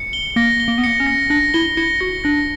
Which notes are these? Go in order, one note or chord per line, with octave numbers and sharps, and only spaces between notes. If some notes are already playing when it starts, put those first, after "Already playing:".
Already playing: C#7
G7
A#3 A#6
G7
A#3
B3
A#3 C#7
C#4
A#6
D4 A#6
E4 G7
E4 C#7
F#4 A#6
D4 A#6